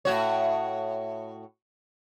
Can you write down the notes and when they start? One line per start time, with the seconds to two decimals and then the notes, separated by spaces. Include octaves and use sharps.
0.05 A2 F#4 C#5